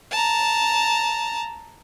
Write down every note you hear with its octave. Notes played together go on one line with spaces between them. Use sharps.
A5 A#5